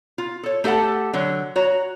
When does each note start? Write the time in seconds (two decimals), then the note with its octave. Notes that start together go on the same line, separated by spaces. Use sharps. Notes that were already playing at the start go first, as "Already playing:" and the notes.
0.18 F4
0.43 A4 C#5
0.64 A3 G4 A4 F#5 A5
1.13 D3 F#3
1.56 F#4 C#5 A#5